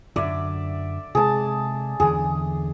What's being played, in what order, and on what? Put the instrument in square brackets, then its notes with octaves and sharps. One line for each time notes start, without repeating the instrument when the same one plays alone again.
[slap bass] F#2 D3 [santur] D5 E5
[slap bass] C3 G#3 [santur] G#4 A5
[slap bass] E2 D3 E3 [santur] G#4